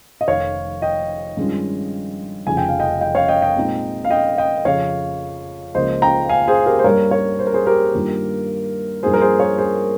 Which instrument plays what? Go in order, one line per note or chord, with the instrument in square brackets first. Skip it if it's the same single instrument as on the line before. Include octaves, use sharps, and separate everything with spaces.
[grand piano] D#5
F1 F2 D#3 C#5 F5
D#5 G5
G2 D#3 G#3 C#4 F4
F1 F2 C#3 F3 G#5
G5
F5
D#5 G5
D#5 G5
C#5 F5
D#5 G5
D#5 G5
A#2 G#3 C4 D#4
F5
D#5 G5
D#5 G5
F2 C#3 F3 C#5 F5
C#2 C#3 F3 A#3 F4 C5 D#5
G5 A#5
F5 G#5
G#4 C5
G4 A#4
C5
G2 G3 A#3 A#4 C#5
A#4 C#5
C5
A#4
G#4 C5
G4 A#4
G2 D#3 A#3 F4
G2 F3 A#3 D#4 G#4 C5
A#4
G#4 C5
A#4 C#5
G#4 C5